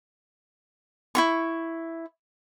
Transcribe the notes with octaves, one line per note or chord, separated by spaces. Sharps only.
E4 F4 C#6